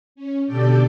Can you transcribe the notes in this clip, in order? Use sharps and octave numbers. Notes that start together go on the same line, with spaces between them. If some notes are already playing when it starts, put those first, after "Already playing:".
C#4
B2 D3 G4 A4 D5 G5